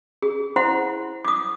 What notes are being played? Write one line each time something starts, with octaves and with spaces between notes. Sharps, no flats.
G#4
E4 C5 F#5 C6
D6 D#6